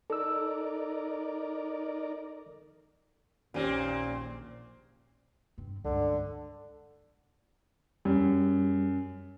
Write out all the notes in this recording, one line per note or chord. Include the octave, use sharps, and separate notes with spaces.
D#4 A4 A#4 D5 E6
A#1 D#2 A#2 C4 C#4 D#7
G2 C4
C#2 G2 D3
F#2 G3